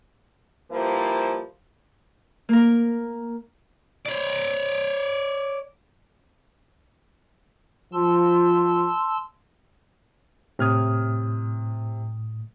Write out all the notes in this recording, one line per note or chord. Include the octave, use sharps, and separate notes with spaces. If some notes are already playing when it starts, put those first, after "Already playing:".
F3 G3 A#3 E4 B4 C5
A#3 A#4
C#5 D5
F3 A5 C6 E6
A2 C3 D#6 F6 G#6